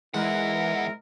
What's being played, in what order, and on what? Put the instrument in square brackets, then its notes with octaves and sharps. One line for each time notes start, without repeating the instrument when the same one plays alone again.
[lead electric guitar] E2 F#5 [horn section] G#2 E4 A#4 [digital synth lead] E3 [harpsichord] G#3